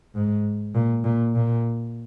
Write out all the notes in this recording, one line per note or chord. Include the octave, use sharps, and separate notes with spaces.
G#2
A#2
A#2
A#2